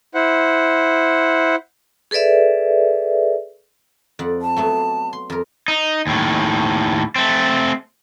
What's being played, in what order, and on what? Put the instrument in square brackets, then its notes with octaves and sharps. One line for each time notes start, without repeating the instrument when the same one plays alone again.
[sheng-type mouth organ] E4 C5 F#5
[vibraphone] G#4 A4 B4 D5 E5
[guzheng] F2 D5 F#5
[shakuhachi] A5
[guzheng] F#3 A3 B3
C6
F2 A#4
[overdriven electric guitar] D#4
D#2 A2
A3 C4